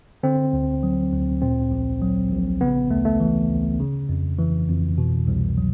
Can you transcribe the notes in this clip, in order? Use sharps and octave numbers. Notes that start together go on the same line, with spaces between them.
D3 C4
D2
F#3
D2
A#2 C4
A#1
F#3
A#1
C#3 B3
D2 A3
A3
E3
D2
C#3
F2
E3
F2
B2
C2
F#3